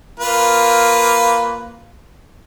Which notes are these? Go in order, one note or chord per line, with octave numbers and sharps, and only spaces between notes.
A#3 F4 B4